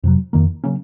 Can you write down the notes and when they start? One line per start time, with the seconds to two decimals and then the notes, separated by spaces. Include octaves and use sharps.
0.04 F2 C3 F#3
0.33 F2 D#3 A#3
0.64 C#3 F#3 A#3 C#4